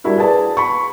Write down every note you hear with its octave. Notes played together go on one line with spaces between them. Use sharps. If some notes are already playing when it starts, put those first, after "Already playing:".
G3 D4 E4 F#4 A#4
G#4 B4 D5 A5
B5 C#6